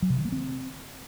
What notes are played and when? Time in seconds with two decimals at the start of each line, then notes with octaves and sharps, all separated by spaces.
0.02 F#3
0.10 C3
0.17 D#3
0.25 A#3
0.32 C4